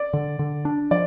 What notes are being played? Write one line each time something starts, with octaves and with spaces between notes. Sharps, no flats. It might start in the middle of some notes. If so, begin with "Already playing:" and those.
Already playing: D5
D3
D3
D4
F3 D5